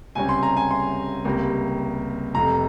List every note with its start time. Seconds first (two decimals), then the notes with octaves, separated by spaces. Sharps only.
0.15 C#2 C3 G3 C#4 G#5
0.29 C6
0.43 A#5
0.57 G#5
0.71 C6
1.25 C#2 C3 G3 A#3
2.35 F1 F2 C3 A#5